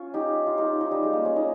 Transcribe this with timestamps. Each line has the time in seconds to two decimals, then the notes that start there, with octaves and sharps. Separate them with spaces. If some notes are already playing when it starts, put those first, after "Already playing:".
Already playing: C#4 F4
0.14 D#4 G4
0.47 F4
0.57 D#4 G4
0.80 D#4
0.91 G3
1.03 G#3
1.13 A#3
1.25 C#4
1.36 D#4